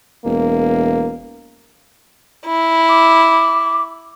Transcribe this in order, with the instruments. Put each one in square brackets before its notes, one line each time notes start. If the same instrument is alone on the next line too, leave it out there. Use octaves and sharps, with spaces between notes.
[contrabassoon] E1 [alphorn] A#3
[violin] E4
[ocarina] D6